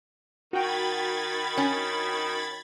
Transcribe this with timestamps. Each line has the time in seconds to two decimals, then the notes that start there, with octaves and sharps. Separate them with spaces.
0.53 D#3 F#4 G5 B5 G#6 A6
1.57 C#4